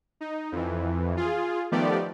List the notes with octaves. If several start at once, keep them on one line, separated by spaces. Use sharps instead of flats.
D#4
F2 E3
F4 G#4
D#3 F3 A3 B3 G4 D5